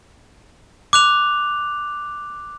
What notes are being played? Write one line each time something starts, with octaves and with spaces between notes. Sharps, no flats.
D6 F#6 F7